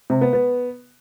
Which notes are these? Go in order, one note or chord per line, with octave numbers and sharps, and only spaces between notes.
C3
B3
B3